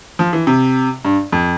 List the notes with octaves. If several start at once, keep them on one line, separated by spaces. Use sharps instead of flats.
F3
E3
C3
G2
F2